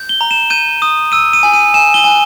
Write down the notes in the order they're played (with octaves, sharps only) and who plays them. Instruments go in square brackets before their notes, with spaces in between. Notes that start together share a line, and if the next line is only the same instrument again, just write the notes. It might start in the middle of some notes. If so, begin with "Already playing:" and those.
Already playing: [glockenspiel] G6
G7
A#5
E7
G6 D#7
D#6
E6 D#7
D#7
G#5
D#7
G#5 E7
G7
G#5